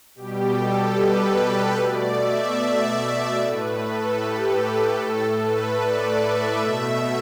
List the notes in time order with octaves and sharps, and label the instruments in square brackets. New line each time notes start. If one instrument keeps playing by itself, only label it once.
[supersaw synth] B2 G3 G4
A4
B4
B2 A3 D5
E5
D5
A2 A3 B4
A4
G4
A4
A2 A3
B4
D5
E5
B2 A3 E5